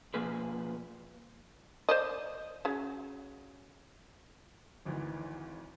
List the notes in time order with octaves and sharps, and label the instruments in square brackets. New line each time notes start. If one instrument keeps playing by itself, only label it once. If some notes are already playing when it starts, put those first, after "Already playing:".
[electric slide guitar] B2 F3 A#3 G#4 B4
[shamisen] C5 D5 D#5
C#3 F#3
[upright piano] G#1 D2 D#3 E3